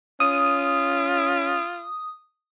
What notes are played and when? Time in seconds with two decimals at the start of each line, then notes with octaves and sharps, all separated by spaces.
0.20 C#4 F4 D#6